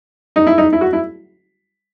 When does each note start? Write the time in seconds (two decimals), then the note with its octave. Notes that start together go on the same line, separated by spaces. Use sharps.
0.36 D#4
0.47 E4
0.58 D#4
0.73 E4
0.81 F#4
0.93 E4